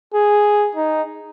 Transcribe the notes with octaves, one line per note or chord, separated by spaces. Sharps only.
G#4
D#4